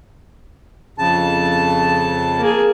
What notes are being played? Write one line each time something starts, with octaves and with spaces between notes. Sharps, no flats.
F2 C#3 A5
A#3 G#4